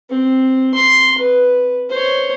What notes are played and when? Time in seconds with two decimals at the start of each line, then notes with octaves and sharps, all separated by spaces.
0.10 C4
0.74 C6
1.18 B4
1.90 C5 C#5